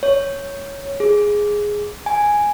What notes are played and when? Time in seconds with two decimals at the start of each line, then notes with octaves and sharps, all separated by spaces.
0.03 C#5
1.00 G#4
2.06 G#5